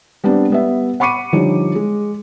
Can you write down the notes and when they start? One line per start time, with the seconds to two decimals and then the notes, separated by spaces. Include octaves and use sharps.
0.24 G3 B3 C4 D4
0.50 G3 B3 E5
1.00 F#5 B5 C#6 D6 C#7 D#7
1.32 D3 F3 G3 D#4 C#5
1.75 G#3